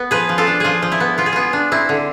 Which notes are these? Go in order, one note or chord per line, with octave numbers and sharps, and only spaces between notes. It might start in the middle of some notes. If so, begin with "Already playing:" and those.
Already playing: B3
F3 G#4 B4
F3
F4 A4
D4
F3 F4 G#4
F3
E4
B3
B3 F4
G#4
B3 F4
D4
C4 E4
D3